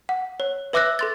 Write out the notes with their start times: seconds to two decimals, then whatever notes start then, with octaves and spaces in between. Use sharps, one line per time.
0.09 F#5
0.40 C#5
0.73 B4 E5 D6 E6 F#6 A#6
0.99 A4 C6 A6